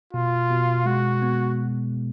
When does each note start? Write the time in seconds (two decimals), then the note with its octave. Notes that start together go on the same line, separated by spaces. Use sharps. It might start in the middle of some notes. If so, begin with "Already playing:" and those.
0.13 B2 F4
0.50 B2
0.86 G#3 F#4
1.22 B3